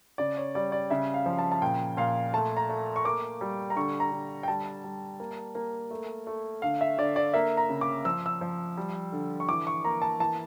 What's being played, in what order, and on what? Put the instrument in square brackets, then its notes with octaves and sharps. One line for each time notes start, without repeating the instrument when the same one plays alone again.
[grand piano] C#3 D5
C#5
G3 D5
D5
C#3 E5
F5
F3
A5
A5
A#2 G5
A#2 F5
A3 A5
A#5
A3
C#6
A#3 D6
G3
A#5
D3 C#6
A#5
D3
G5
G3 A5
G3
A#3
A#3
A3
A3
D3 F5
E5
D3 D5
D5
A#3 E5
A#5
C#3
D6
F3 E6
E6
F3
G3
D3
C#6
E3 D6
C#6
A#3 A#5
A5
E3 A5